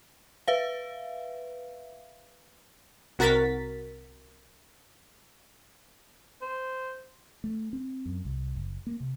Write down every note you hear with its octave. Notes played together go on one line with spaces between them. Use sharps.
B4 E5 F5
C2 F#4 A#4 A6 B6
C5
A3
C4
F#2
C2
F#1
A#3
C3